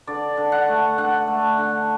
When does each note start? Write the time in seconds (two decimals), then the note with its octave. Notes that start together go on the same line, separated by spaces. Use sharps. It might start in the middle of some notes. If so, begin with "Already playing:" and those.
0.07 D3 D5
0.37 D3
0.52 F#5
0.68 A3
0.98 D3 F#5
1.28 A3
1.58 D3